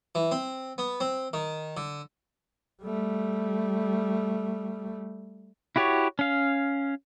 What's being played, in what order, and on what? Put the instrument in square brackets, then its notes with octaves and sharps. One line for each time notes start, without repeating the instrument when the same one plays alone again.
[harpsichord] E3
C4
B3
C4
D#3
D3
[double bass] G3 A3
[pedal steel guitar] E4 F#4 G4 C#5
C#4 F5